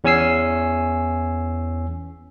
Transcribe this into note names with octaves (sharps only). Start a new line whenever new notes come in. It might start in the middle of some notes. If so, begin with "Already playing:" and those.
E2 C#4 G#5 E6 C7